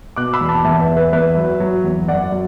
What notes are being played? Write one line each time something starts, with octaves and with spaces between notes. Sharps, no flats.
B2 D6 F#6
B5 E6
E2
A5 D6
E2 E5 A5
B4 E5
E2
B4
E2 B4 E5
F#3
F#3
E2
F#2 D5 F#5
F#3